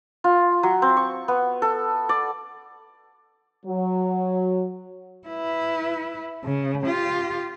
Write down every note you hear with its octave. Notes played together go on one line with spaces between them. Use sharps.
F4
F#3
C4
C#6
B3
A4
D5
F#3
E4 B4
C#3
F4 G4